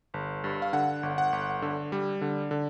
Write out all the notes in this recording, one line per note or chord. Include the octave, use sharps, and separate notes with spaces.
G1
G2
F5
D3 F#5
G1
F#5
G1
D3
G3
D3
D3